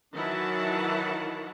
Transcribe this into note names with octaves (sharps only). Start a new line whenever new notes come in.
D#3 E3 F#3 E4 F#5 A5